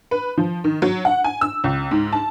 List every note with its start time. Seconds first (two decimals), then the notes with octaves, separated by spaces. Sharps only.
0.11 B4
0.37 F3
0.64 D#3
0.82 F#3
1.05 F#5
1.24 G#5
1.41 E6
1.64 C#2
1.91 G#2
2.13 A5